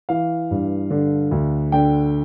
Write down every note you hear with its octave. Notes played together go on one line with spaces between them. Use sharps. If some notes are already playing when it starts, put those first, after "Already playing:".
E3 F5
G2
D3
D2
D3 G5